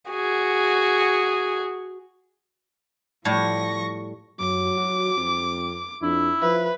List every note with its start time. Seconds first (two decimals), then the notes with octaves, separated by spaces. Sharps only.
0.10 F#4 G#4
3.25 A2 F3 G3 C#6 A#6
4.40 F#2 F#3 D6
4.77 F#4
5.17 F2 C4
6.02 F2 D4 E4
6.42 F3 B4 E5